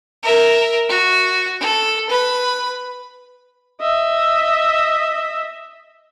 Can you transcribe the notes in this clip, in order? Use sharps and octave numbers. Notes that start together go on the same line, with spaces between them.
A#4 E5
F#4
A4
B4 B5
D#5 E5